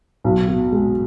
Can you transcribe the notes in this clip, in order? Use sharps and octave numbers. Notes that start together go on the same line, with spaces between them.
B1
B2
G#3